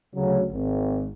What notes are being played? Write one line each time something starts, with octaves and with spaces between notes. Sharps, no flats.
D2 C#3 F#3
G#1